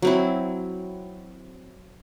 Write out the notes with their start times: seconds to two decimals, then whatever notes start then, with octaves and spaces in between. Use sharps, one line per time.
0.02 F#3 C4 E4